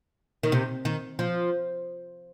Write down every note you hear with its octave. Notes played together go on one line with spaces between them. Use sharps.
D#3
C3
D#3
F3